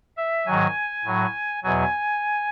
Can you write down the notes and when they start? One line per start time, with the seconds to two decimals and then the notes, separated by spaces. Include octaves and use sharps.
0.17 E5
0.46 G#2 D#3 F#3 G#5
1.05 A2 F#3
1.64 E2 B2 F#3 G#5